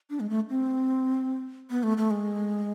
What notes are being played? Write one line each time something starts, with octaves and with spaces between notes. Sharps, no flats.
D4
G#3
A3
C4
B3
A3
A3
G#3